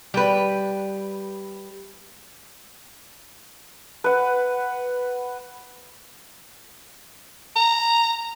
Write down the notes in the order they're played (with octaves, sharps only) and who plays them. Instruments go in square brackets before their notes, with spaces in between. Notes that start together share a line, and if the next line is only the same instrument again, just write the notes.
[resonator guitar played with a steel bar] G3 B4
[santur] B4 F#5
[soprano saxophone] A#5